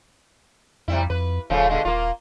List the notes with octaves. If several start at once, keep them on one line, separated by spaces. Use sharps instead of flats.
F2 C3 G3 E4
F2 B4
D#1 C#3 F3 A3
B2 D3 G#3
D#1 A#3 F4